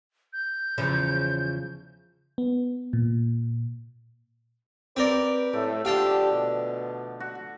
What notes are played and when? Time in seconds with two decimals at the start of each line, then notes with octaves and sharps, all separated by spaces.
0.33 G6
0.78 E2 C#3 F3
2.38 B3
2.93 A#2
4.97 C4 G4 A#4 B4 D5
5.53 A2 A3
5.85 D3 F3 G4 F5 G5 A5
6.32 B2
7.20 F#4